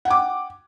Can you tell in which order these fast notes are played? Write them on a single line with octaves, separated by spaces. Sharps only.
F#5 G5 D6